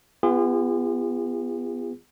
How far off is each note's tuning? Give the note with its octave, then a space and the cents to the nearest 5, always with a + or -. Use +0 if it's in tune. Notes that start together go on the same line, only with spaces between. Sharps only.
B3 +15 F4 -30 G#4 -40